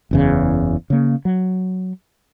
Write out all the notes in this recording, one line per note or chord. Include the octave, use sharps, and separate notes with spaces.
F#1 E2 C#3
C#3 A#3
F#3